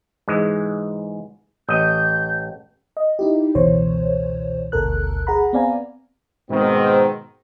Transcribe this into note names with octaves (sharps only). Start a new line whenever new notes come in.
G#2 E3 G#3
A1 D#5 G6
D#5
D#4 E4 G4
G1 C#2 B2 E3 C5 C#5
G#1 D2 B2 A4 A#4 F#6
G#4 F#5 A#5 B5
B3 C4 D5 F5 G#5 A#5
G#2 B2 D#3 C4